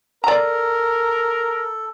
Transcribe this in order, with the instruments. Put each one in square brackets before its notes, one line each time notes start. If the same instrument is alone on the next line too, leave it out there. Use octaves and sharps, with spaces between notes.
[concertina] A4 [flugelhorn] A#4 [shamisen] D5 A#5